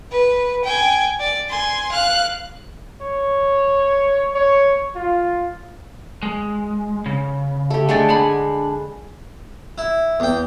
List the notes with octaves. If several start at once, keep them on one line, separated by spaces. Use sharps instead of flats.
B4
G5 G#5
D5
G#5 C6
F5 F#6
C#5
C#5
F4
G#3
C#3
A3 G4
D3 G#3 A3 D5 G#5
D4 F#5 G#5 B5
E4
E2 G5